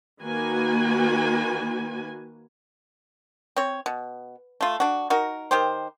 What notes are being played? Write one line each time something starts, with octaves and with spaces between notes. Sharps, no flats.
D#3 A#3 F#4 B4 G#5
C4 C#5
B2
A3 F4
D4 F#4
D#4 F#4 A#4
D#3 G4 C5